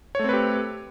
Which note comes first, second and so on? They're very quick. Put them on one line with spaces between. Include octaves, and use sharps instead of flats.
C#5 A3 C4 B4 G4